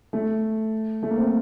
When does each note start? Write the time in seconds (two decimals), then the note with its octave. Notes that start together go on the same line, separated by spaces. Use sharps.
0.13 A3
1.03 A3
1.10 A#3
1.17 C4